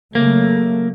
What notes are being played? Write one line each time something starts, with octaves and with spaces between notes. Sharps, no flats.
C#3 F#3 A3 A#3